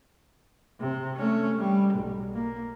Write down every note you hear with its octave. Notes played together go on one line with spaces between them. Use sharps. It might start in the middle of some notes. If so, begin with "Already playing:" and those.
C3
A3 C#4
G3
B1
A#3